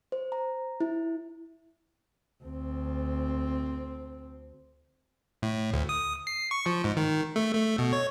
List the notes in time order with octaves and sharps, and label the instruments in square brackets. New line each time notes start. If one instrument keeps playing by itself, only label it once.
[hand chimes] C5
A#5
E4
[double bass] D2 C4
[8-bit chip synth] A2
D2
D#6
C7
C#6
F3
G#2
D#3
A3
A3
B2
C#5